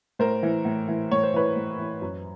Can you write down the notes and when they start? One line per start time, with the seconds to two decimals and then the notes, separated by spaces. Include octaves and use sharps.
0.19 A2 A#4 C5
0.43 E3
0.65 A2
0.88 E3
1.11 A2 C#5
1.23 C5
1.34 E3 B4 C#5
1.56 A2
1.79 E3
2.02 F#2